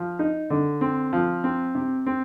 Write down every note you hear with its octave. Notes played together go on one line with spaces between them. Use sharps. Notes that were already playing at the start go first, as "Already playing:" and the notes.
Already playing: F3
D#4
D3
C4
F3
C4
C3
C4